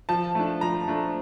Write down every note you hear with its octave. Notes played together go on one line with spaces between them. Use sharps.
F3 A5
A3 D4
F3 A#5
A3 D4